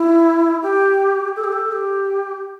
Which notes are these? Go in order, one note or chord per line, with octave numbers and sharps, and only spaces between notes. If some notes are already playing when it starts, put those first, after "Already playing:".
Already playing: E4
G4
A4
G4
A4
G4